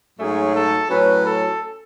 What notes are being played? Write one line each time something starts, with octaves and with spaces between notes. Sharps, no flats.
G#2 F#3 A3 C#4 G#4
A4
A2 F#3 C#4 B4
A4